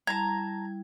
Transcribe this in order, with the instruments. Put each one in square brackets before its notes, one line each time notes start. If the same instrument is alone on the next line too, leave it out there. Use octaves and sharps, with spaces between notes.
[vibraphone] G3 E4 [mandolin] A5 A#5 [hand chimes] G#6